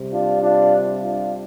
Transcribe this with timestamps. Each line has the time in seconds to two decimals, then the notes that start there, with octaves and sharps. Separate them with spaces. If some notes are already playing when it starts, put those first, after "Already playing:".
Already playing: C3 G3
0.13 D4 F4
0.42 D4 F4
1.02 D4 F4